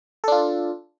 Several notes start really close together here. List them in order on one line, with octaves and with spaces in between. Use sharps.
A4 D4 F4